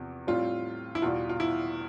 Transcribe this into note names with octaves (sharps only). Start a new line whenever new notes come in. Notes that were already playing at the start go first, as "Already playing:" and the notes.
Already playing: E2 C3 F3
A2 G3 C4 F4
E4
E2 B2 G3 F4
F4
E4